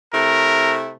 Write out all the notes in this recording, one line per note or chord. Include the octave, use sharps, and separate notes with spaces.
C3 A3 E4 A#4